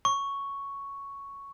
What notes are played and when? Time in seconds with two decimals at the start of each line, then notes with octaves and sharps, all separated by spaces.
0.05 C#6